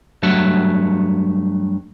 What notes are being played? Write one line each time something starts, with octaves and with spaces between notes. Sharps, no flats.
G2 F#3 A3 E5 F#5